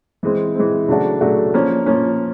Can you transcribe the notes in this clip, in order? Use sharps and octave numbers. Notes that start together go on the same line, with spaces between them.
E3 G#3 C4
E3 G#3 C4
C#3 F#3 A3 D4 F#4
C#3 F#3 A3 D4 F#4
F3 A#3 C#4
F3 A#3 C#4